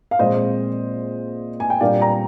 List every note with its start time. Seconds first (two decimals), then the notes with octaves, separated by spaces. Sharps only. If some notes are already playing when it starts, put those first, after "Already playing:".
0.11 F5
0.19 A#2 F3 G#3 C4 C5 D#5
1.60 G#5
1.70 G5
1.80 A#2 G3 A#3 D4 D5 F5
2.01 G5 A#5